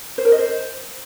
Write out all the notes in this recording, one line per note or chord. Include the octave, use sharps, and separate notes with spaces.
C5
A#4
D#5
C5